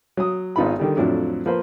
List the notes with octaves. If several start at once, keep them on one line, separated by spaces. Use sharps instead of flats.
F#3 D#6
G#1 B3 D#4 F4 B4 B5
D3 D#3 G3
F2 A2 F3 F#3 D4 E4
F3 A#3 B4 C5